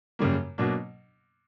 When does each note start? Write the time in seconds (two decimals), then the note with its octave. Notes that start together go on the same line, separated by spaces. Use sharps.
0.19 F#2 C#3 G3 A#3
0.58 B2 F#3 A#3 D4